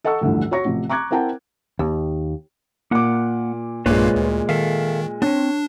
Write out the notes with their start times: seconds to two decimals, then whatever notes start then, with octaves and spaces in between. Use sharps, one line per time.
0.04 A4 D#5 F#5 A5 C#6 E6
0.21 A1 D2 G2 D3 E3 F3
0.51 F#4 C#5 C#6 A#6
0.65 A1 C3 F3
0.89 A#5 C#6 D6 F#6 G#6
1.11 C4 E4 A#4 F#5 G5 A5
1.79 D#2
2.91 A#2 A#3 F#5 D6
3.86 B1 G2 A#2 G#3 A#3 F4 B4 C#5
4.16 D2
4.49 D#3 A4 E5 F5
5.22 B3 C4 D4 C#5